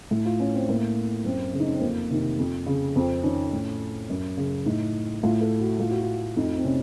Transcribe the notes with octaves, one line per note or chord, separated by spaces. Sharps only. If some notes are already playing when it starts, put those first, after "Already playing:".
A2
F4
C#4
C4
A2 A#3
F#2 C4
C#3
D#4
C#4
C4
F2 A#3
C3 D#3
F2
C#3
F2 C4
D#3 C#4
A2
F#2
C#3
A2 D#4
A2 F4
A4
F#4
A2 F4
F#4
F4
F2 D#4
C4
C3 C#4